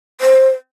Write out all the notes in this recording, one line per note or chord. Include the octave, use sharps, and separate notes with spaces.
C5